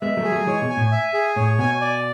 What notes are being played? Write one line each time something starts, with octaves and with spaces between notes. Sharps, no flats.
G#3 B3 E5
F#3 A3
G#4
F#3 A3
E3 G#3 C#5
B2
G#5
A2
E5
G#4
A2 C#5
B2 G#5
D5